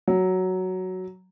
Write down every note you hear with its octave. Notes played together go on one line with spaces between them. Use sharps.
F#3